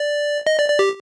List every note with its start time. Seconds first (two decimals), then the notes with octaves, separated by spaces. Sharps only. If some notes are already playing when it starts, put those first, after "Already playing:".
Already playing: D5
0.47 D#5
0.58 D5
0.69 D5
0.79 G4